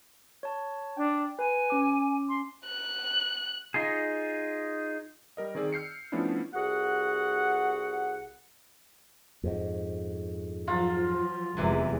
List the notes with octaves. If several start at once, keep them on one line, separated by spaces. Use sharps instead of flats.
C#5 A5
D4 G5
B4 G#5
C#4 D6
C6
F#6
D#4 F4 G#4
G3 A#4 D#5
D#3 C4 G#4 D5 E6
F6 G6 C7 C#7
F3 A3 B3 C#4 D4 E4
C2 F#4 G#4 F#5
F2 G#2
F3 F#3 F4
F1 E2 C3 E3 F#3 G#3